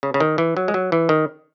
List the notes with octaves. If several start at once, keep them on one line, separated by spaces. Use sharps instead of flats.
C#3
C#3
D#3
E3
F#3
G#3
F#3
E3
D#3